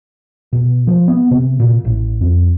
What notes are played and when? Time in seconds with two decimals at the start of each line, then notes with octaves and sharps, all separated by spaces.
0.53 B2
0.87 F3
1.08 B3
1.31 C3
1.60 A#2
1.85 A1
2.21 F2